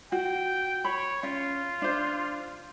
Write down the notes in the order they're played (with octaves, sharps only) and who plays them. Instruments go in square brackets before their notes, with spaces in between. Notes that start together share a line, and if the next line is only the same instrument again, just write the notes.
[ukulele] F#4 [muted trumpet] G5
[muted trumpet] C#5 [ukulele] B5
[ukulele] C#4 [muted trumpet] F4
[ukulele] D4 C5